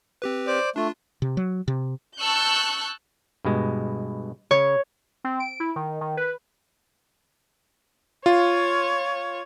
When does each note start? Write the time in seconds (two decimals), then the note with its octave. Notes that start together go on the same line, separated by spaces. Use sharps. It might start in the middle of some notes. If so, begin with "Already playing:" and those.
0.22 C4 G4 B4
0.47 C5 D5 D6
0.76 A3 D4 F4
1.22 C3
1.37 F#3
1.68 C3
2.20 A5 C#6 E6 F#6 G6
3.45 G2 B2 G#3
4.51 C#3 C#5
5.24 C4
5.40 D7
5.60 E4
5.76 D#3
6.01 D#3
6.17 B4
8.26 F4 C#5